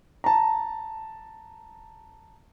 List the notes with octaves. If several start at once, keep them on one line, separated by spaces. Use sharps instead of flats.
A5 A#5